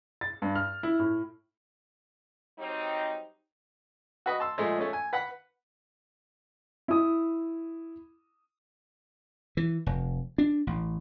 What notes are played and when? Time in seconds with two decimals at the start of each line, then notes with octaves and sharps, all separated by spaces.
0.21 A6
0.42 G2
0.56 F6
0.83 E4
0.99 A2
2.59 F#3 G3 C4 D#4
4.26 F#4 B4 D#5
4.40 A5 C6 E6
4.58 A#2 F3 G#3 A3
4.78 A3 C#4
4.93 G#5
5.13 B4 F#5 B5
6.88 E4 D#6
9.57 E3
9.86 F1
10.38 D4
10.67 A1